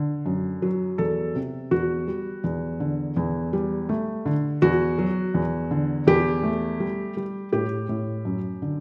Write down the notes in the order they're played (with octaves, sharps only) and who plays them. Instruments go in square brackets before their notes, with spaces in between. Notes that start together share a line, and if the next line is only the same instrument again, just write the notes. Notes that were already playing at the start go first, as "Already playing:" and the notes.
Already playing: [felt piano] D3
F#2
F#3
E2 A4
C3
E2 F#4
G3
E2
D3
E2
G3
A3
D3
E2 F#4
F#3
E2
D3
E2 G4
A3
G3
G3
A2 G4
A2
F#2
D3